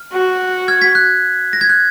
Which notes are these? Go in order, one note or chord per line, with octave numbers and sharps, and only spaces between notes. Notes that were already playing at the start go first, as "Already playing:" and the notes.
Already playing: F6
F#4
F6 G#6
G#6 B6
F#6
A#6
G#6
F#6